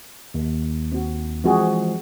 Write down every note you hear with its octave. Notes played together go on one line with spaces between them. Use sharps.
D#2
C4 F#4
E3 F3 G#3 C4 F#4 G#4